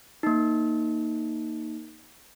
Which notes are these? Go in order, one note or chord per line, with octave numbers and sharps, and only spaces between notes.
A#3 D#4